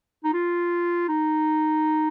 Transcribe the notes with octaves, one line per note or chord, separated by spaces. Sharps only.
D#4
F4
D#4